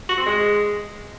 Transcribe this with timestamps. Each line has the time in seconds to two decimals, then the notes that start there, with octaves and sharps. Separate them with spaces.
0.09 F#4
0.18 C4
0.26 G#3